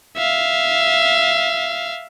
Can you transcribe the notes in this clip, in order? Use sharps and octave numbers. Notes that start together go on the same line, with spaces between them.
E5 F5